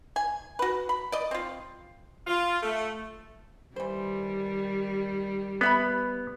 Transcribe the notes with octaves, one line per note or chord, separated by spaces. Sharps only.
G#5
F#4 B4
B5
D5 D#5
C4 F4
F4
A3
D#3 E3 G3 C5
B3 B4 E5 B5